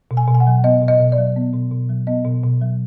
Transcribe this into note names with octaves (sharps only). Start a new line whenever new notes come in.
B2
G#5
B2
G#5
F#5
F#3
B3 D#5
B2
D#5
B2
D5
F#3
B3
B2
B2
F#3
B3 D#5
B2
B2
F#3